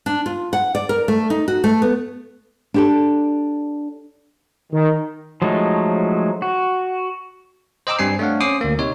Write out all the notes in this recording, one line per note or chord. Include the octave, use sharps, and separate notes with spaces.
D4
F4
F#5
D5
A#4
A3
D#4
F#4
A3
B3
D4 G4 A4
D#3
F3 F#3 G#3 A3 D#4
F#4
C5 D#5 G5 A#5 D6 E6
G2 G3 C4 G#5 C7
A3 C4 D4 C#5 F5 F#5
C#4 C5 D6 D#6 C7
D2 A#3
C3 D#4 C#5